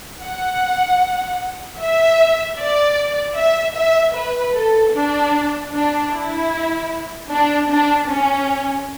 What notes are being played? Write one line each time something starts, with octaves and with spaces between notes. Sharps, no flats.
F#5
E5
D5
E5
E5
B4
A4
D4
D4
E4
D4
D4
C#4